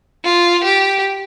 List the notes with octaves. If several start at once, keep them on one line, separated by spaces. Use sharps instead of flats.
F4
G4